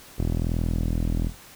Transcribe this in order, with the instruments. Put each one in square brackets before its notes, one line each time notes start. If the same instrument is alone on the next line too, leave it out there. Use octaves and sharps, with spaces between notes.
[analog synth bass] E1